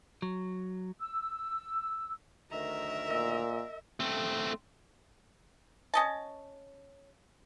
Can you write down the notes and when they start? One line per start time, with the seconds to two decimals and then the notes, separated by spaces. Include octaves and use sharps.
0.22 F#3
1.00 E6
2.51 D2 D#3 A#4 E5 A#5
3.10 A#2 D#5 E6 A#6
4.00 A3 C4
5.94 C#4 D#5 A5